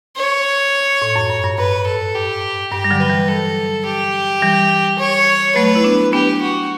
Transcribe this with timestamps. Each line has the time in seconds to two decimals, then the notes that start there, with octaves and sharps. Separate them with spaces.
0.16 C#5
1.02 A2
1.16 F#2
1.30 G2
1.44 G2
1.58 G2 B4
1.86 A4
2.15 G4
2.72 G2 G4
2.84 G3
2.90 D3 F#3
3.00 B4
3.09 E3 G3
3.28 A4
3.85 G4
4.42 E3 G3
4.99 C#5
5.55 F#3 A3 B4
5.75 E4
5.84 B3 D4
6.13 B3 D4 G4
6.41 F#4